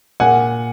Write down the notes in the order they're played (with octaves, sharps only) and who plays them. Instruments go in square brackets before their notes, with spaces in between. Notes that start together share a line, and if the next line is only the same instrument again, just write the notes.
[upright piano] A#2 F#5 G#5